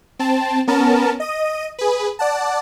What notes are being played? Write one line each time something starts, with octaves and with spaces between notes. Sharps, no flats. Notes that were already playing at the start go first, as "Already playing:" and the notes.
C4 A5
B3 C#4 A#4 A5
D#5 D#7
G#4 B4
D5 F#5 A5